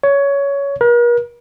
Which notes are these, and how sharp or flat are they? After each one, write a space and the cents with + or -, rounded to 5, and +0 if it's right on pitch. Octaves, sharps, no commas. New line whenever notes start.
C#5 +15
A#4 +45